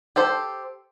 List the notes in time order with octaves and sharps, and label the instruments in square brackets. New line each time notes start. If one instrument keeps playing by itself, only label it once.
[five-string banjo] G4 A4 C5